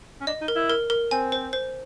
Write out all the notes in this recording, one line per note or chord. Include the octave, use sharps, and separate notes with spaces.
C#4
D4 D#5
D#4
A#4
E4
A#4
A#4
C4 G#5
C5
C5